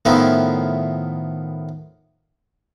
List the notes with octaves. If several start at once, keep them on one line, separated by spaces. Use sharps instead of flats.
A2 D#3 F3 B3 E4